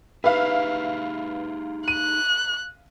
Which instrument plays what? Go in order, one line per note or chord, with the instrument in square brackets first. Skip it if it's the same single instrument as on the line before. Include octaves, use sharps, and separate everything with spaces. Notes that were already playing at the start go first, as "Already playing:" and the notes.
[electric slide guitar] D#4 G4 G#4 [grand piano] B4 [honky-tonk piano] E5 F5
[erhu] F#6 [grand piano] D#7